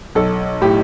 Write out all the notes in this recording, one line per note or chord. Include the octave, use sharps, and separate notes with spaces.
B1 A4
A2 G4